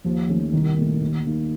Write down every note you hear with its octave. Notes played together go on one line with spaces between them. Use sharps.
D#2 F3
D#3 A3 C#4
C2 D#3
A#2 A3
D#2
D#3 A#3 D#4